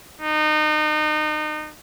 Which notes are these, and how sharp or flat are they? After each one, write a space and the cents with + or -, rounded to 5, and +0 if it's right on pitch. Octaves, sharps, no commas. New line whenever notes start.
D#4 -30